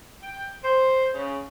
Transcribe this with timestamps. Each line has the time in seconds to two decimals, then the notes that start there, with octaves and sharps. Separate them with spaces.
0.22 G5
0.63 C5
1.13 C#3